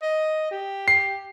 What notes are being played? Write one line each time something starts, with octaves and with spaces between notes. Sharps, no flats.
D#5
G4
C7